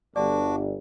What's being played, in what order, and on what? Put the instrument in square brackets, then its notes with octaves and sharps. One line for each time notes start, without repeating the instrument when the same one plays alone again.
[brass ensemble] G1 [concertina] D4 F#4 D6 [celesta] D5